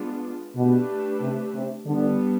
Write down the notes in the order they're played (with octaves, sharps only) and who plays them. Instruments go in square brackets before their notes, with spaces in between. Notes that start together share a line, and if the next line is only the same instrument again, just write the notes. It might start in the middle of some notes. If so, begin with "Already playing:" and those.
Already playing: [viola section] G#3 B3 D4 F4
[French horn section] B2 [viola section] A3 D4 G4 B4
[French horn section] C3
C3
[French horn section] D3 [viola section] G3 B3 D4